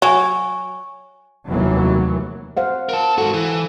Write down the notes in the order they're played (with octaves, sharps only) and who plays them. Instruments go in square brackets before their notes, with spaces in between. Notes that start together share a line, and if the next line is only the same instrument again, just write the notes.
[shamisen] F#3 [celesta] G#5 C#6
[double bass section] F1 D#2 E3 F#3 B3
[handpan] C5 F5 F#5
[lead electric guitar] A#4 A5
[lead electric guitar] G#2 F#4 [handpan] A4
[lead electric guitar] E3